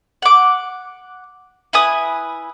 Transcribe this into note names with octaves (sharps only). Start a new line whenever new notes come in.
F#5 D6
E4 B4 G#5 D#6